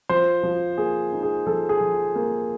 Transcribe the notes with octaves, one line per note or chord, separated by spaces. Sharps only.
F3 C5
F3
A#3 G#4
D#4
G#4
F3 A4
G#4
F3
A#3